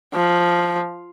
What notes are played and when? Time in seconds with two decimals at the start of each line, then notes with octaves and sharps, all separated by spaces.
0.14 F3